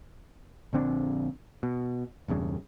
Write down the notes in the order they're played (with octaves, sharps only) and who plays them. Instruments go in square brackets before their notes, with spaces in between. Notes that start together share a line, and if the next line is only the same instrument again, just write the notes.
[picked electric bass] A#1 D3 C4 D4
B2
E1 E2 G2 C#3